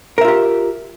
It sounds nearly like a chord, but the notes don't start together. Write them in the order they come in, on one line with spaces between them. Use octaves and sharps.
A#4 E5 F4 G4